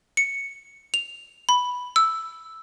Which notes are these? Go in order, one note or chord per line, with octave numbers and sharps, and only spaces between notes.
C#7
F7
B5
E6